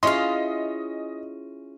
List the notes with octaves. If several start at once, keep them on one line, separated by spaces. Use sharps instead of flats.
C#4 E4 F4 G#4 D#5 F5 C6